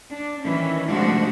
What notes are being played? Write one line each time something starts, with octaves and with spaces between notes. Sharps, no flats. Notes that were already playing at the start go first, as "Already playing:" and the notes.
D4
D#3 E3 C#4
C3 F3 G#3 A3 D4 F#4